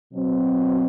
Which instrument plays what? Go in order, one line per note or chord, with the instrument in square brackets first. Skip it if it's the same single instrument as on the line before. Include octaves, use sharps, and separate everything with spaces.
[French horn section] B2 F#3 C4